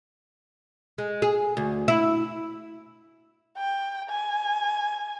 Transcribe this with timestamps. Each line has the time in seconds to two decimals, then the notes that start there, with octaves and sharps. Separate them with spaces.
0.98 G#3
1.22 G#4
1.57 D2
1.88 E4
3.57 G5
4.09 G#5